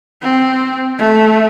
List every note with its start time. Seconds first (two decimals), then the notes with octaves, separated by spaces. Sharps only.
0.22 C4
0.99 A3